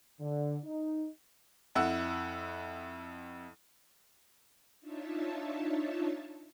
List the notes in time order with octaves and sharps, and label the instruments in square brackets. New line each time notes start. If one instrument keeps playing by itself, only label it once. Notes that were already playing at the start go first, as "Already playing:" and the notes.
[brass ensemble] D3
D#4
[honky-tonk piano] F2 E4 F#5 E6
[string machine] D4 D#4 F4 C#5 E5 A5